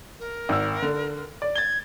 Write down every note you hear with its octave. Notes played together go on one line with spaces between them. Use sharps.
A#4
G#1 E6
D3
D5
G#6 A6 G7